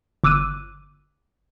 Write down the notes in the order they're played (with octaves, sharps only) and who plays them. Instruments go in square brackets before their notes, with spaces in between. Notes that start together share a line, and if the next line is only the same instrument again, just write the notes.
[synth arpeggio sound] G1 D6 E6 F#6 D#7